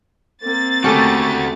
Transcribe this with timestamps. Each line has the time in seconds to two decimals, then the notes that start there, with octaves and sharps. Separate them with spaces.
0.43 A#3 C4 A6
0.84 A3 C#4 F#4 G4 A4